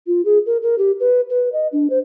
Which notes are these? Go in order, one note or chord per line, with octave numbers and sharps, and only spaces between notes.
F4
G#4
A#4
A#4
G4
B4
B4
D#5
D4
C5